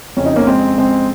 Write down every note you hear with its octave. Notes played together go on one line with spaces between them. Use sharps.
F2 C#3 C#4
D#4
A#3 C#4
G#3 C4
G#3 C4